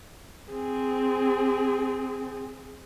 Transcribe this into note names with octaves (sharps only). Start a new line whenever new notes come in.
C4 G#4